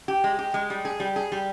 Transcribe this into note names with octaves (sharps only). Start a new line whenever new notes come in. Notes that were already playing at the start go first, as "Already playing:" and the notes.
G4
G#3
G4
G#3
G3
G#4
G3
G#4
G3